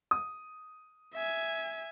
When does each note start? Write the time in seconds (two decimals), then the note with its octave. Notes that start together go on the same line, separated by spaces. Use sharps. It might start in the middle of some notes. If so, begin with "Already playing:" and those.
0.11 D#6
1.15 E5 G#5